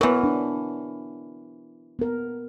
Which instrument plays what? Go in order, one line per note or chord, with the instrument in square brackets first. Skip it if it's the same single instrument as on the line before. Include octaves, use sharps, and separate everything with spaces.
[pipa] E3 F#3 [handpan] B3 A#4
[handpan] D4
B3 A#4